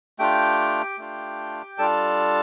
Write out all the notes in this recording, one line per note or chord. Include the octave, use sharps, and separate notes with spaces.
A3 D4 F4 G4 G5
A3 D4 F4
G3 D4 F4 A4 A5